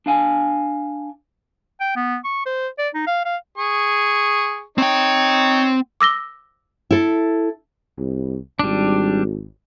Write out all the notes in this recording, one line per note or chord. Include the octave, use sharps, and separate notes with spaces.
D4 F5 G#5
G5
B3
C#6
C5
D5
D#4
F5
F5
G#4 C#6
C4 D#4 C#5 G5
D6 E6 A#6 G7
E4 A4
C2
G#1 G3 D4